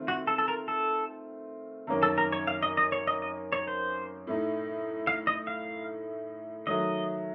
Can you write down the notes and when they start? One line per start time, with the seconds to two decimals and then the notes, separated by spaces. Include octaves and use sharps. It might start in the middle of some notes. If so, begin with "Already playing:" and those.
Already playing: D#3 A3 C4 F4
0.08 F#4
0.27 A4
0.38 A4
0.48 A#4
0.68 A4
1.87 F#2 D#3 A#3 C#4
2.03 A4
2.18 A#4
2.32 C#5
2.47 F5
2.63 D#5
2.77 D#5
2.92 C#5
3.07 D#5
3.22 D#5
3.53 C#5
3.67 C5
4.27 A2 A3 D#4
5.07 F5
5.27 D#5
5.47 F5
6.67 D#3 F#3 A3 D#5